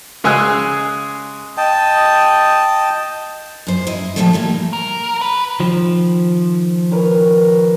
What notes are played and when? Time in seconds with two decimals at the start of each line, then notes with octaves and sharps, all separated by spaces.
0.24 C#3 G#3 G#4 G#5 E6 F#6
1.57 D#5 G5 A5
3.67 F#2 C5
3.87 E4 D#5
4.16 A#2 D3 D#3 F3 G3 A3
4.33 E3 G3 A#3
4.73 A#4
5.21 B4
5.60 D#3 F3
6.91 A#4 B4 C#5